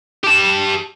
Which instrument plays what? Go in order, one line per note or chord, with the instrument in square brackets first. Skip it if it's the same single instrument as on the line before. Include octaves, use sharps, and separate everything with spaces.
[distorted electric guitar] G4 A5